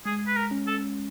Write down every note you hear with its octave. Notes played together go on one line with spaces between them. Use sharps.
G#3 G#4
B4
A#4
C#4
A4